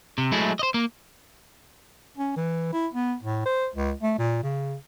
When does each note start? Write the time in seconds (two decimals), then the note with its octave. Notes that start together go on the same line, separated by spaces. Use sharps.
0.18 C3
0.32 F#3 G#3 A3 E4
0.59 C5 D#5
0.74 A#3
2.17 C#4
2.36 E3
2.73 E4
2.94 B3
3.23 A2
3.46 C5
3.75 C#2
4.03 A3
4.18 A#2
4.43 C#3